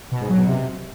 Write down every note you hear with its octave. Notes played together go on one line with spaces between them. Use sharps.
B2
G#2
F#3
B2
C3